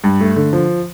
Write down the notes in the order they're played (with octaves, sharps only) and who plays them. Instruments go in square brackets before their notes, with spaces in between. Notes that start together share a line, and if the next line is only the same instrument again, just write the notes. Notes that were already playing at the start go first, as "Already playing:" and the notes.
[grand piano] G2
A3
D3
F3